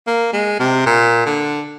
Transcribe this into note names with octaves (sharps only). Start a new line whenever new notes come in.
A#3
G#3
C3
A#2
D3